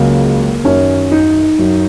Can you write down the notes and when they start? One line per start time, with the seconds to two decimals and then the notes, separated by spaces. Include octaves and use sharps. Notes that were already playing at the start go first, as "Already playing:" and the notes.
Already playing: C#2 C#3 F#3 A#3
0.64 F#2 D#3 F#3 C#4
1.11 D#4
1.58 F#2 F#3